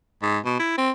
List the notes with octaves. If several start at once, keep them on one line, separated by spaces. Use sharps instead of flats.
G#2
B2
E4
C4